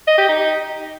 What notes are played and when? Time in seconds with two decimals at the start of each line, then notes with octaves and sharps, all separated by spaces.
0.08 D#5
0.18 G4
0.29 D#4